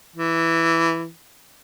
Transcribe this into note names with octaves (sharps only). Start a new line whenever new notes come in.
E3